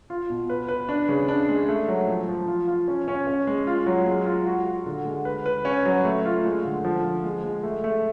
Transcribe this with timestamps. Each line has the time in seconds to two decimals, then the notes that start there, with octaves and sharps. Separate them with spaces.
0.10 F4
0.30 B2
0.49 B4
0.68 B4
0.89 D4
1.09 C#3
1.28 D4
1.49 G#3
1.68 A3
1.88 F#3
2.07 F3
2.28 F3
2.48 F4
2.67 F4
2.88 C#4
3.08 C#4
3.27 C#4
3.47 G#3
3.67 F4
3.86 F#3
4.07 G#3
4.26 F4
4.46 F#4
4.66 F#4
4.86 D3
5.05 G#3
5.25 B4
5.46 B4
5.65 C#4
5.85 F#3
6.05 A3
6.25 F4
6.45 G#3
6.65 D3
6.85 F3
7.04 F4
7.24 G#3
7.44 G#3
7.63 A3
7.84 A3